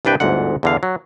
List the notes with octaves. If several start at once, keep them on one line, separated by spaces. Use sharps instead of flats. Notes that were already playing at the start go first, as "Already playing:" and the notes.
C2 G2 D4 B4 G5
G1 D2 G#2 F#5
E2 D3 F5
F#3